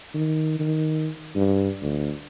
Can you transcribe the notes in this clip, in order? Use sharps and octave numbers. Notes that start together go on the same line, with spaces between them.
D#3
D#3
G2
D2